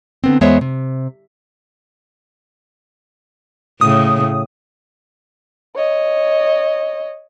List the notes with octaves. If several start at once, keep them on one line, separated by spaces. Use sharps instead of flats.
D3 B3 C4
E2 G#3 B3 C5 C#5 E5
C3
A2 C#3 D#6
C#5 D#5